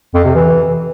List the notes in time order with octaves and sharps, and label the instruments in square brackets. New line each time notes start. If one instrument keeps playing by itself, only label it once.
[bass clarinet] F2
C3
E3